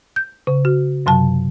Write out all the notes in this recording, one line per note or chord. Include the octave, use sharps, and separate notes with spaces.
G6
C#3
F#4
F#2 C3 F#3 A5